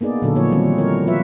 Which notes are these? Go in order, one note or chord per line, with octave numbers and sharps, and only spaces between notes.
A#3 B3 D#4 G#4 D5
A#2 D3 F#3 F#4 A4
F3 A#3 D#4 F#4 G#4 C#5
D#3 G3 C4 C#4
G3 E4 A#4 C#5
F3 F4 B4 E5